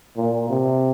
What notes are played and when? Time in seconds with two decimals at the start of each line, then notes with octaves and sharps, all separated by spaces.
0.17 A#2
0.50 C3